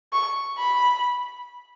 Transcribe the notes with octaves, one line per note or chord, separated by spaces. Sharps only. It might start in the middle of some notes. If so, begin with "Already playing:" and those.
C#6
B5